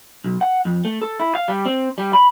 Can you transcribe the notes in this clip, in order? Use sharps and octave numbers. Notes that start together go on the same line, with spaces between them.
B1
F#5
F2
A3
A4
E4
F5
G3
C4
G3
B5